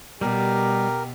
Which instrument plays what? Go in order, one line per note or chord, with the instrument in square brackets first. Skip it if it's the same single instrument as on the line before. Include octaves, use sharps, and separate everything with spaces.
[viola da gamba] B2 [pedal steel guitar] G3 [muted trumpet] G4 [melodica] A#4